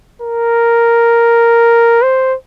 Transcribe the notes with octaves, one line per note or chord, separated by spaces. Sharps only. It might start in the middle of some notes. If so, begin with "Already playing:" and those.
A#4
C5